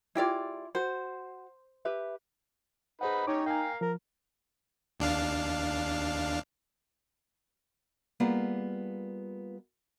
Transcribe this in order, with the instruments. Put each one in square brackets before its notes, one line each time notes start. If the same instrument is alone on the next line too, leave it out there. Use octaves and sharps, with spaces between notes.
[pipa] G#3 G4 D5 [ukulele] E4 F4
[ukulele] F#4 [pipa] C5
[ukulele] G4 B4 E5
[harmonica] D#4 B4 B5 [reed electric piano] G#4 C5 F#5
[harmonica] C#4 G4 C#5 [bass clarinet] D#4 [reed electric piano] D6
[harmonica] A#4 F5 [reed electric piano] G5 G#5
[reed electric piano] F3 [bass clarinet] A#4
[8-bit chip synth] D#2 D4 F5
[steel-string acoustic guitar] G3 A#3 B3 F4 G#4